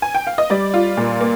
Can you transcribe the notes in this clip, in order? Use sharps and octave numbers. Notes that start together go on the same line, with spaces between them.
G#5
G5
F5
D#5
G3 D5
F4
A#2
A#3